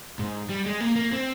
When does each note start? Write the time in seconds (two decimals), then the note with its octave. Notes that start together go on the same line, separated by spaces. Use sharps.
0.19 G#2
0.50 G3
0.66 G#3
0.80 A#3
0.96 A#3
1.12 C4